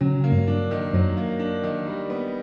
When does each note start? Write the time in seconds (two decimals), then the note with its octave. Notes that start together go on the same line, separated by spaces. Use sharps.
0.01 C#3 F#3
0.24 A#3
0.32 G2
0.47 D4
0.71 D#3
0.93 F#2 F#3
1.17 A#3
1.39 D4
1.63 D#3
1.87 G3
2.10 B3